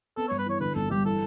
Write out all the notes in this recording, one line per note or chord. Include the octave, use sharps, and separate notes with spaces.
B3 A4
G2 C#5
B4
E3 C#5
D3 B4
G1 A4
G2 G4
E3 A4